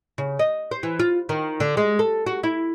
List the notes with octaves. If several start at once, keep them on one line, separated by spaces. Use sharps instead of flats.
C#3
D#5
C5
E3
F4
D#3
D3
G#3
A4
F#4
E4